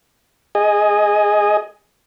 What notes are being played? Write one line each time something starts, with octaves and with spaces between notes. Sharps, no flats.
G#4 D#5